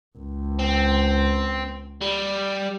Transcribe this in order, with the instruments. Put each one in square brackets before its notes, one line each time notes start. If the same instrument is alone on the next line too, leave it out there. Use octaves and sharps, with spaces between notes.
[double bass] C#2
[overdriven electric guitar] C4
G3